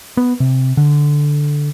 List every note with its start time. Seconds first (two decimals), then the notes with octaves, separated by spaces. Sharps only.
0.17 B3
0.40 C3
0.77 D3